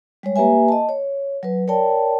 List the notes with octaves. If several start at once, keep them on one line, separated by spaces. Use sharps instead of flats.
G3 G#3 C#5
A#3 G4 B4 E5 G#5
D#5 A5
C#5
F#3 B4
A#4 C#5 D5 G5 A5